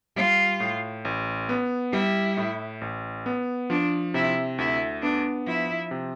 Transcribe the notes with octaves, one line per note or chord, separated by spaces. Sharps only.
G3 F4
A2
A1
B3
G3 E4
A2
A1
B3
F3 D4
C3 E4
D2 E4
B3 D4
F3 E4
C3